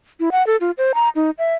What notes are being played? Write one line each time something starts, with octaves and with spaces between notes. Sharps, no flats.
E4
F#5
A4
F4
C5
A#5
D#4
E5